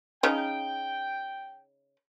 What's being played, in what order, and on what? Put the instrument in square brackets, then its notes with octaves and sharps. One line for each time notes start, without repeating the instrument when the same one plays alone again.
[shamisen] C#3 D#4 [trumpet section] G5